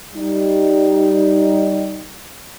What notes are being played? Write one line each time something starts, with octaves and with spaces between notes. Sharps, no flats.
G3 D#4